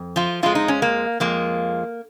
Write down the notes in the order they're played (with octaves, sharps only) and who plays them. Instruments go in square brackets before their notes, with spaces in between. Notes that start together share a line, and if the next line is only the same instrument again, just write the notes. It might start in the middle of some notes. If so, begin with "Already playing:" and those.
Already playing: [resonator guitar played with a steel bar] F2
F3 F4
F2 F3 G#3 F4
D#4
C#4
A#3
F2 F3 G#3 A#3